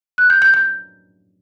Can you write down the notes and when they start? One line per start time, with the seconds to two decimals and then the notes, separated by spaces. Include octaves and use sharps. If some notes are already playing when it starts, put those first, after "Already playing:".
0.18 F#6
0.30 G6
0.42 G6
0.54 G6